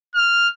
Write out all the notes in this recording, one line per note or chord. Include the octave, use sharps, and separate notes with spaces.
F6